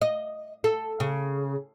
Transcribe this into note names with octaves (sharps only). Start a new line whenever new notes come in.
D#5
A4
C#3